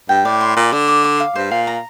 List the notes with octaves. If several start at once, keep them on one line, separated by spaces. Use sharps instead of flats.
G2 G5
A2 D5
C6
A#2 D5
D3 D5
D6
D6
F5
G2 C5
A#2 F5
A#5